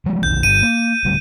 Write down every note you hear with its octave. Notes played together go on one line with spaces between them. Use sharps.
F3 G3 G#3
F1 B1 D#3 G6
G1 D#7
A#3
D1 D2 G3